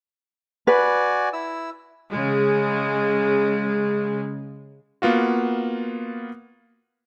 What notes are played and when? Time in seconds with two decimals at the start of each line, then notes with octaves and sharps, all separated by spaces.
0.67 F#4 B4 D5 G#5
1.33 E4 E6
2.10 C#3 G#3
5.02 A#3 B3 F4 F#4